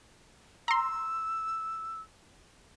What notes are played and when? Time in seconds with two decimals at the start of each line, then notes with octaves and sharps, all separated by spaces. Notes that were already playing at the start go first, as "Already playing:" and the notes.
0.68 A#5 C6 E6